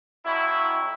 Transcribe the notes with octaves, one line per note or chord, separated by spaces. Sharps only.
F2 F#3 E4